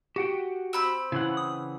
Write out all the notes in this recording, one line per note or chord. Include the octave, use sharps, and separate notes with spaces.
F#4 G4 F#5 G5
C4 B5 E6
C#3 E3 E4 F#5
D#6